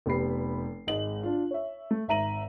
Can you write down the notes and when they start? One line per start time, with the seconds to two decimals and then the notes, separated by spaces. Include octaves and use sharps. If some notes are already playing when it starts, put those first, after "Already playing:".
0.06 F1 B3 G4 B5 C7
0.87 G#1 G#3 D#5 F#7
1.23 D4 F4
1.51 C#5 E5
1.91 A3
2.08 G#1 E5 A#5 D#7 F#7